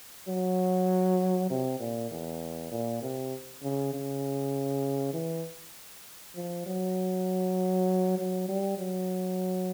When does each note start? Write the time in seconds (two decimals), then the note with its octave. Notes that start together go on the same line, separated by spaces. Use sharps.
0.28 F#3
1.50 C3
1.79 A#2
2.11 E2
2.71 A#2
3.02 C3
3.63 C#3
3.93 C#3
5.13 E3
6.36 F3
6.66 F#3
8.18 F#3
8.48 G3
8.78 F#3